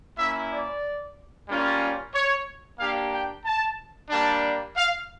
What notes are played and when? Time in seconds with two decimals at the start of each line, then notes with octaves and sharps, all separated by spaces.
0.17 A#3 C#4 E4 E5
0.50 D5
1.48 G3 A#3 C#4 F4
2.14 C#5
2.79 A#3 D4 G4 F5
3.12 G5
3.45 A5
4.10 G3 A#3 D4 A5
4.76 F5